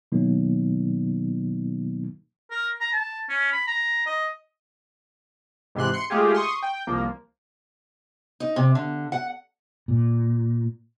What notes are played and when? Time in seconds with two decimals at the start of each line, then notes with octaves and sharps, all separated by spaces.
0.12 B2 D#3 F#3 A#3 B3 D#4
2.51 A#4
2.81 A#5
2.93 A5
3.29 C#4
3.52 B5
3.67 A#5
4.06 D#5
5.75 G#2 C3 E3 C6 F#6
5.94 C6 C#7
6.10 G#3 A3 F4 G4 G#4
6.35 C6 C#6 D#6
6.63 G5
6.87 C2 F3 A#3
8.40 D#4
8.56 C3
8.75 D3
9.12 F#5
9.88 A#2